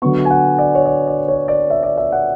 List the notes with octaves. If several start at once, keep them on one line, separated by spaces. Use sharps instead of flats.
D3 F#3 B3 C#6
G#5
F#5
D5
C#5
D5
D5
C#5
D5
E5
D5
E5
F#5